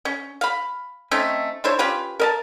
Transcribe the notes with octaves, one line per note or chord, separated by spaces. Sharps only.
C#4
F5 B5
A3 C4 C#4 D#4
D4 E4 C5 C#5
C#4 F4 G4 B4
A#4 D#5 A5